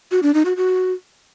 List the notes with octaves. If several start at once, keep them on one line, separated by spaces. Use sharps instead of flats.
F#4
D4
D#4
F#4
F#4